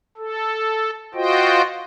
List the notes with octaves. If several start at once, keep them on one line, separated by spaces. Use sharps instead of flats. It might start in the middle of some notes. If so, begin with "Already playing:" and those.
A4
F4 F#4 C5 D#5 G5